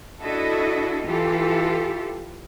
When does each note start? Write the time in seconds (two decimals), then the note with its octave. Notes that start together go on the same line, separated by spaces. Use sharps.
0.21 D4 E4 F#4 A4 D#5
1.06 E3 F4 G4 A4